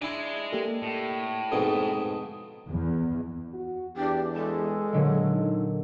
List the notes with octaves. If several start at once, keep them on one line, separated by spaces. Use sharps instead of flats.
G#3 D4 E4 G#4
A#3 G4 A4
A2
F2 G#2 B2 D#6
E2
F#4
E2 D4 G4
G#3 A4 A5 E7
A#2 D3 F#3 D#5
D#4